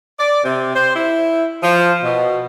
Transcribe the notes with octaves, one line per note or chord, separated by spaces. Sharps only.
D5
C3
C5
E4
F3
B2